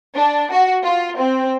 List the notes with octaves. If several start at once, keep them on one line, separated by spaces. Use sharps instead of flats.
D4
F#4
F4
C4